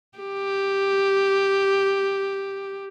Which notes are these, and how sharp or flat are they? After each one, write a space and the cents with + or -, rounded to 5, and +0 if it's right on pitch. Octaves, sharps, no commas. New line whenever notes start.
G4 +0